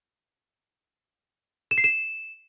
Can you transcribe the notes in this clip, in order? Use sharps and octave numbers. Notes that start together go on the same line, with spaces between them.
E7
C7
E7